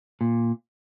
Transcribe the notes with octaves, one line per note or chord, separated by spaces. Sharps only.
A#2